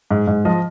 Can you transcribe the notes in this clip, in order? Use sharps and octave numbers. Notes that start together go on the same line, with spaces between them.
G#2
G#2
F3 D#5